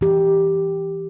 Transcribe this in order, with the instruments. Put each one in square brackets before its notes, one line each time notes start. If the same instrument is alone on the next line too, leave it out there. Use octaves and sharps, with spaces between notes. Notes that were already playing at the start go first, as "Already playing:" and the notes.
[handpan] E3 G4